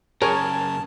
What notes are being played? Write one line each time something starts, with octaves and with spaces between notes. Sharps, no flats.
F#2 C#3 G#4 A#4 C#5 G#5 A5